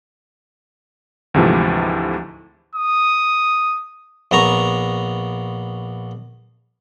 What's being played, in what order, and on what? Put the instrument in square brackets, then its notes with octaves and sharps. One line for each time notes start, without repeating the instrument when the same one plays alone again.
[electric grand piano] D2 G#2 C3 E3 F3 A3
[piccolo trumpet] D#6
[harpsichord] A#1 B3 A#5 C#6